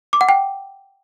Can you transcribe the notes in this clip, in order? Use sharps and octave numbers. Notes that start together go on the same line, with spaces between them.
D6
F#5
G5